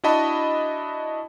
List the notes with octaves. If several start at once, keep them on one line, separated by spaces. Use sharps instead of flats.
D4 E4 F#4 D#5 A5 B5